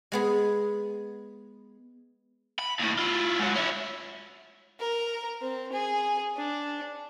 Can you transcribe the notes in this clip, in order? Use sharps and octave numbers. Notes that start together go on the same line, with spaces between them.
G#3 B3 G#4
B5
D#2 A2
E4 F4
G#2 F#3
C#4 E4
A#4
C4
G#4
D4